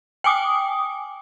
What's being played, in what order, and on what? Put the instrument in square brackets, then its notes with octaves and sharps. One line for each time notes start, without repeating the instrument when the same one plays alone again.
[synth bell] G5 G#5 D6 D#6